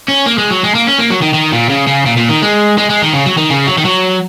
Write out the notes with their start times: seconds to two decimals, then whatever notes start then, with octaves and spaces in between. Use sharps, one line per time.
0.08 C#4
0.26 A#3
0.38 G#3
0.51 F#3
0.63 G#3
0.75 A#3
0.87 C#4
0.99 A#3
1.10 F#3
1.22 D#3
1.34 D#3
1.52 A#2
1.70 C#3
1.88 C#3
2.06 A#2
2.17 A#2
2.30 D#3
2.43 G#3
2.78 G#3
2.90 G#3
3.02 D#3
3.13 C#3
3.26 F#3
3.38 D#3
3.50 C#3
3.67 F#3
3.78 D#3
3.85 F#3